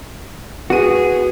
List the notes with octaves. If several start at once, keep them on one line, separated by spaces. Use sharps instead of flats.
B3 F#4 G#4 B4 D#7